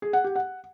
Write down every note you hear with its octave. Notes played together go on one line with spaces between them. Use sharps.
G#4
F#5
G4
F#5